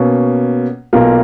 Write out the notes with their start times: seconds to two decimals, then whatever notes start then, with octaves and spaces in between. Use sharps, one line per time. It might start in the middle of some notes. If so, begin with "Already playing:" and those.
Already playing: B2 A#3 C#4
0.93 B1 B2 A#3 F4 A#4